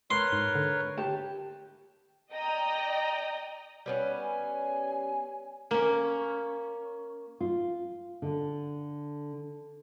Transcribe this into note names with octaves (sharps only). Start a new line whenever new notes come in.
A#4 B4 C#5 C6
G#2
D3
G4 A5
D5 D#5 G5 A#5 D#6
G3 B3 C#4
G#5
A#3 C#4
F4
D3